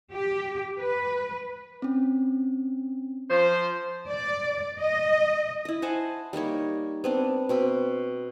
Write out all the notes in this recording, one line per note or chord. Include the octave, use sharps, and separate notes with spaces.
G4
B4
C4 C#4
F3 C5
D5
D#5
E4 D#5
C5 F#5 G#5 A5
G3 A#3 D#4 C#5
B3 C4 D4
B2 C4 B5